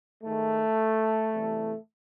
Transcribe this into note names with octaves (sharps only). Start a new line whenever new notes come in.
G#2 D#3 G#3 A3
E2 C3 E3 G3